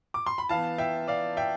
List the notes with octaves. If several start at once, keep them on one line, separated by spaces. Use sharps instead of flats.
D6
C6
B5
E3 B3 F5 A5
E5 G5
D5 F5
E5 G5